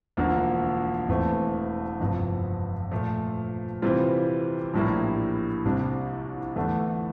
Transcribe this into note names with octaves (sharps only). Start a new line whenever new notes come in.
E1 D2 D3 F3 A#3
E1 E2 E3 A3 C4
G1 F2 C3
A#2 F3 A3
C3 E3 G3 C4 F4
A#1 A2 G3 A#3 E4
C2 C3 G3 D4
E2 D3 A3 D4 A4